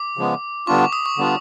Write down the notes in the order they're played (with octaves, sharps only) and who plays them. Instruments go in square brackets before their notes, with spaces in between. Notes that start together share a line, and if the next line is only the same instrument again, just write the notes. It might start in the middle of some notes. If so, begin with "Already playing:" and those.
Already playing: [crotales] D6
[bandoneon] C#3 F3 G#3 B3
[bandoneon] D3 G3 B3 D4 F4 [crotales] C#6
[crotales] D6
D#6
C#6
[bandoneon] D3 G3 B3 D4 F4